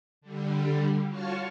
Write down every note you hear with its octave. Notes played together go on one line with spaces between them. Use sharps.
D3 G3
F4 F#4 C#5 A5 C#6 F6